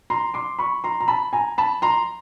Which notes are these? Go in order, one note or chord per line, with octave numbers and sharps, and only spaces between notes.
A#5 C6
C6 D6
B5 C#6
A#5 C6
A#5
A5 B5
G#5 A#5
A5 B5
A#5 C6